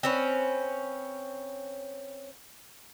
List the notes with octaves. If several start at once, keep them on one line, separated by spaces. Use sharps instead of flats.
C4 C#4 B4